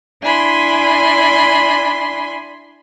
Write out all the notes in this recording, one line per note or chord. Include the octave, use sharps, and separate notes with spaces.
D4 E4 G#5 B5 C6